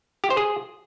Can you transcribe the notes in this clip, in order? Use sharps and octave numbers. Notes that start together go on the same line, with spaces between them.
G4
C5
G#4